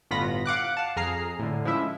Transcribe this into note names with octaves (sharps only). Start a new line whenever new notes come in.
G1 A2 B3 F4 B5 A#6
F5 F#5 D6 F#6
F5 A5
F2 G#4 A#5 F6 C7
A2 D3
F3 G#3 C#4 E4 E5